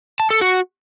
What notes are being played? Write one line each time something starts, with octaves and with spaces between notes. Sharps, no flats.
A5
A4
F#4